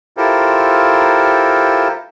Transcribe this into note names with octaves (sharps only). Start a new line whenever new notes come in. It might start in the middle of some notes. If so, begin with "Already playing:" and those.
E4 F4 G4 A4 A#4 C5